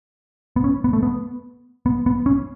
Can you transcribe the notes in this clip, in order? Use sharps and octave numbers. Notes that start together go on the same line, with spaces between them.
B3
C#4
B3
A3
B3
B3
B3
C#4